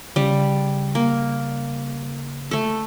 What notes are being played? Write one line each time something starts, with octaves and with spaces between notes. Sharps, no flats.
C#3 G3
A#3
A3 A4